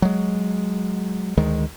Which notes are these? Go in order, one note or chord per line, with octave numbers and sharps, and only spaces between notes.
F#3 G#3
D2 D#3 G#3